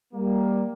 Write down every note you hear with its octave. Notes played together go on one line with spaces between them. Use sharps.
G3 A#3